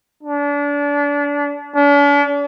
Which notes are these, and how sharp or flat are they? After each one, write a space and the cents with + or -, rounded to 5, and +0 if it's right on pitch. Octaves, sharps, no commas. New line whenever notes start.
D4 -30
D4 -45